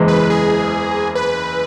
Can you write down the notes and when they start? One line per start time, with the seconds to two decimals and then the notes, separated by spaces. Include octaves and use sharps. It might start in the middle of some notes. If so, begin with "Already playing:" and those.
Already playing: F#1 E2 E3 G#3
0.08 B4
0.30 G#4
1.15 B4